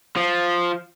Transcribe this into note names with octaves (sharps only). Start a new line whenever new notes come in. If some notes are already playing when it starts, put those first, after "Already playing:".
F3